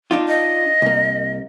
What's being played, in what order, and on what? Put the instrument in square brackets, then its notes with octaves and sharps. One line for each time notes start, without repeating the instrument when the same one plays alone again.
[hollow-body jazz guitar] D4 D#4 F4
[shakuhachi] D#5
[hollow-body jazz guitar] C2 A#3